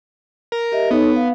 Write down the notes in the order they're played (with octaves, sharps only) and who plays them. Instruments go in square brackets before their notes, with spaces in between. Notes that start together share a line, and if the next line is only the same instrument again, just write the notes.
[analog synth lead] A#4
[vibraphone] G4 D#5 E5
[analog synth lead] B3 [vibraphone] D#4 A4 C#5
[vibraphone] F5